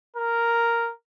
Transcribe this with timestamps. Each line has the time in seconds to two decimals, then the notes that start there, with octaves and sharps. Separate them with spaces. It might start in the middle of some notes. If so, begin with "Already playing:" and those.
0.16 A#4